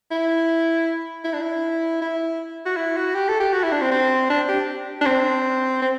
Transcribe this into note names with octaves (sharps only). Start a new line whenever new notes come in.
E4
E4
D4
E4
E4
F#4
E4
F#4
G4
A4
G4
F#4
E4
D4
C4
C4
D4
G4
D4
C4
C4